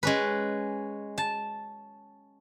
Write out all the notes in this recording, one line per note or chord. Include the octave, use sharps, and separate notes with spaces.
G#3 C#4 B4
A5